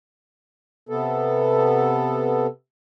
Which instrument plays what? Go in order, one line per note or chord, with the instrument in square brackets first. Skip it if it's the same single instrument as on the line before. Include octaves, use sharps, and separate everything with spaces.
[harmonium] C3 B3 A4